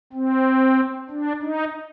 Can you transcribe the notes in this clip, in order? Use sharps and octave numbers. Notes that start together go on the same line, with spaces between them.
C4
D4
D#4